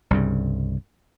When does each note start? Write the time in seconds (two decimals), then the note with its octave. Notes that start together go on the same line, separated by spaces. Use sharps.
0.11 C2 G2 C#3